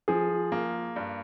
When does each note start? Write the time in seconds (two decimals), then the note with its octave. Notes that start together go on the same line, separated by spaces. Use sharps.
0.08 F3 G#4
0.52 A#3
0.96 G2